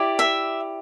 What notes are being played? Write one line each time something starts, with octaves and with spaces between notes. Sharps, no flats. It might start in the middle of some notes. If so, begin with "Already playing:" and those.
Already playing: E4 G4 D5
E5